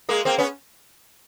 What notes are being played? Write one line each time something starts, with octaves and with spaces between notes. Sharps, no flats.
G#3 A#3
A#3 C4
B3 C#4